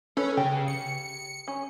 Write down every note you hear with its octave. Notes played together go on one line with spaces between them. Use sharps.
C#4 A4 B4 C#5
C#3 G4
C#7
C#4